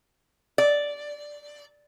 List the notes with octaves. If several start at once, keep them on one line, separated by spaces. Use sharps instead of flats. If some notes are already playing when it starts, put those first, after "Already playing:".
D5